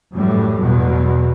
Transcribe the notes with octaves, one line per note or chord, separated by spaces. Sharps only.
F#2 A2 E3 G3
E2 B2 F#3